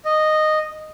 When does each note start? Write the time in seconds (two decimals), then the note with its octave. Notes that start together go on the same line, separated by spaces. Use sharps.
0.05 D#5